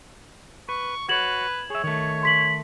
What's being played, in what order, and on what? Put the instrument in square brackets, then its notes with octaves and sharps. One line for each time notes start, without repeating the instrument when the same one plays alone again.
[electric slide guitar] B4 [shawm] C#6
[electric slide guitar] F#4 C#5 [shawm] B4 [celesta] G#6 E7 F#7
[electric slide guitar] G#4 E5 [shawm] C#5
[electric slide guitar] D#3 A3 [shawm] C#5
[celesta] C6 B6 F#7